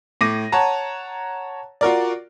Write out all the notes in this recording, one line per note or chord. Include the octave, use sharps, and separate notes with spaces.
A2 D6 A#6 D#7
C#5 F#5 A5 A#5
F4 F#4 A#4 D5